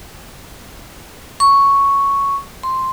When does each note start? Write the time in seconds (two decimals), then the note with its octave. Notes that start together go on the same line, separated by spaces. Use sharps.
1.40 C#6
2.63 C6